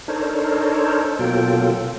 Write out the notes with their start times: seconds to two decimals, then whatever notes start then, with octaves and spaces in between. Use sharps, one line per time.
0.08 D4 D#4 A4 A#4 C5 C#5
1.19 B2 F#3 A#3 F4 A4 G5